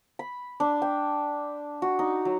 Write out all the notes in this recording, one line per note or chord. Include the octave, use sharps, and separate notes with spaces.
B5
D4
G5
F#4
D#4
F#3